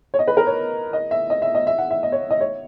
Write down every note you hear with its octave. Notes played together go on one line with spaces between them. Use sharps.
C#5
D#5
B4
A#4
C#5
D#5
E5
D#5
E5
D#5
E5
F#5
E5
D#5
C#5
D#5
C#5